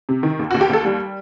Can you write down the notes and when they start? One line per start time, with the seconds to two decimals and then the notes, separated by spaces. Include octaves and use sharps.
0.09 C3
0.23 D#3
0.39 D#2
0.51 F#4
0.54 D#2
0.61 G4
0.70 D#2 A4
0.85 G3